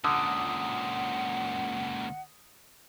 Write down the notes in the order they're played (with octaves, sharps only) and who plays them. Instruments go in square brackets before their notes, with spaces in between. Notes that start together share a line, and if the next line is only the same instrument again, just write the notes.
[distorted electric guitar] C#2 A#2 [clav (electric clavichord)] D3 [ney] F#5 [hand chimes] D#6